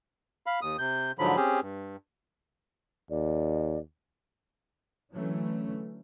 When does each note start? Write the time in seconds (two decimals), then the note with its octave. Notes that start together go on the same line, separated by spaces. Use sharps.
0.46 F5 B5
0.62 D#2 D#6
0.78 C3 G6
1.19 G#2 D3 F3 F#3 B5
1.36 C4 C#4 G4 G#4
1.62 G2
3.10 D#2 D5
5.11 D3 E3 F#3 A3 C#4